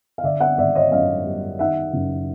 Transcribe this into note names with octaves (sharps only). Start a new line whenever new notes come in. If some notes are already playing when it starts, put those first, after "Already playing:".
F5
D3 D5 E5
E5 F#5
G#1 D5 E5
C#5 D#5
F#2 D#5 F5
G3
D#3 E5 F#5
F#1